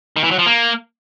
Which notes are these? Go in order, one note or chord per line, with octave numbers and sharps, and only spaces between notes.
D#3
E3
F#3
F3
A#3